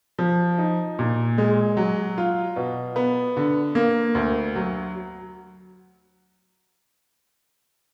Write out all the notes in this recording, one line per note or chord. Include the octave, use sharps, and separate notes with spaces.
F3
D#4
A#2
G#3
F#3
F4
B2
B3
D3
A#3
D2
F#3